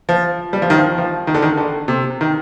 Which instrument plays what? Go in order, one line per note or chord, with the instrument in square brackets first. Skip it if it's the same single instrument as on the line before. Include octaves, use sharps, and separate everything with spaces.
[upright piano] F3
G3
F3
D#3
F3
F3
D#3
D3
D#3
D3
C3
D#3